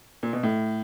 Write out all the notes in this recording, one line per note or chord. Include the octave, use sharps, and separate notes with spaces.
A#2
B2
A2